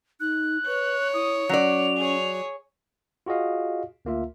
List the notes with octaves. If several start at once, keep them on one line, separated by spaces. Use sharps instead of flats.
D#4 F#6
B4 C#5
E4 D#6
F#3 C#4 D5 F7
G#4 C#5
F4 F#4 G#4 D#5 F5
D2 A#3 F4 E5